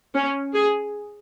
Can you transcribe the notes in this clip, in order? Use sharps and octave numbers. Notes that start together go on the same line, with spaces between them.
C#4
G#4